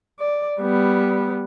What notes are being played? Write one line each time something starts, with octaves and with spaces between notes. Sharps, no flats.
D5
G3 B3